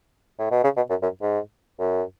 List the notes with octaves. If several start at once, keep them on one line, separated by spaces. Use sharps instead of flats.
A2
B2
C#3
B2
F#2
F#2
G#2
F#2